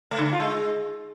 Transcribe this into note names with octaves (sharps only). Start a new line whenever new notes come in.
A3
D3
A3
F4
G#3